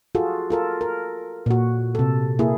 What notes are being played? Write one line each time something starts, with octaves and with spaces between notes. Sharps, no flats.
F4 F#4 G#4 A4
F4 A4 A#4
A#4
A#2 F#4
C3 A4
A#3 E4 G#4